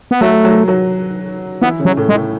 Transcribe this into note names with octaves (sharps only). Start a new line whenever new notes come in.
B3
F#3 A3 F#4
F#3 F#4
F#3 F#4
E3 B3 E4
C#3 C#4
F#3
A2 A3
G#3
A2 A3